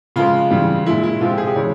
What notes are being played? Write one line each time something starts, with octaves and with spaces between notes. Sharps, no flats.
C#3 F3 G#3 F4
C#3 E3 G3
A#2 G#3 E4
E4
C3 F3 G#3 F4
G4
G#4
G4
C#3 E3 G#3 C#5